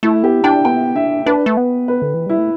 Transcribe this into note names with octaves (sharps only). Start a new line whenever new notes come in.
A3 E4
B3 G4
D4 G5
B3 G5
D4 E5
D4 B4
A3
B3
B4
D3
E3
G3 E4
A3